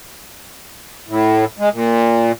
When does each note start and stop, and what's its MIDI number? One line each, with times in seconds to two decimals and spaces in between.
1.08 1.45 45
1.59 1.69 56
1.73 2.32 46